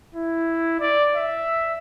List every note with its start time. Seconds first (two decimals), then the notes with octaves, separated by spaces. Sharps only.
0.15 E4
0.80 D5
1.15 E5